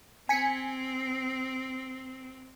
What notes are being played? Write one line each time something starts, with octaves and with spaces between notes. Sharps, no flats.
C4 G#5 B6 C#7